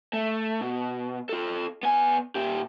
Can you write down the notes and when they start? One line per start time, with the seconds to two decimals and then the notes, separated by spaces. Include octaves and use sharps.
0.13 A3
0.61 B2
1.29 F4 A4
1.83 B3 G#5
2.35 A#2 G4